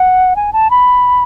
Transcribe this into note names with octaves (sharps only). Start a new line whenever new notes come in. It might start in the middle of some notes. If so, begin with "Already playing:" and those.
Already playing: F#5
G#5
A5
B5